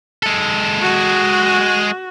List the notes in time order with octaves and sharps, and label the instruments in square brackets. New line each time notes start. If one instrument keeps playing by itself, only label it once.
[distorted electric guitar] G#3 A4
[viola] F#4